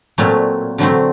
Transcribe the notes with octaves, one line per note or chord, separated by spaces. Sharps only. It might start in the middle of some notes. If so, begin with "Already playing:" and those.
A#2 F#3 A3 C4
D3 F#3 A3 C4